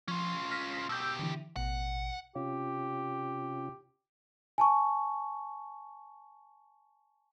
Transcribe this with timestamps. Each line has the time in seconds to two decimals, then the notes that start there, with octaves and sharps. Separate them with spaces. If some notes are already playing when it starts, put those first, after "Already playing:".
0.08 F3 C#4 F4
0.51 F6 A#6 B6
0.89 B2 G4 E6 G6
1.19 D3 E3
1.56 A1 B2 F#5
2.35 C3 C#4 F4 G4
4.58 G#5 A5 C#6